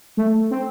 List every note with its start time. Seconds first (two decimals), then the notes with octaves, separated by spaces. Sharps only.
0.17 A3
0.51 C4